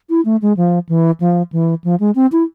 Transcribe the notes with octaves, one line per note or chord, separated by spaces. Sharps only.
E4
A3
G#3
F3
E3
F3
E3
F3
G#3
C4
E4